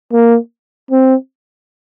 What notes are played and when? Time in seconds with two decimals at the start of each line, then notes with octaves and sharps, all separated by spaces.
0.13 A#3
0.91 C4